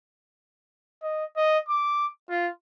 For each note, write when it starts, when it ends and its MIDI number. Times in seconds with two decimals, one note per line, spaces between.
1.02 1.24 75
1.36 1.58 75
1.68 2.06 86
2.30 2.48 65